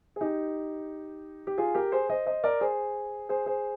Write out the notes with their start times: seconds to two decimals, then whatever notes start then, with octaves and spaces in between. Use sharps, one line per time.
0.16 G#4
0.21 D#4 G4
1.47 G4
1.58 F4 G#4
1.75 G4 A#4
1.92 G#4 C5
2.09 C5 D#5
2.26 C5 D#5
2.44 A#4 D5
2.60 G#4 C5
3.29 G#4 C5
3.46 G#4 C5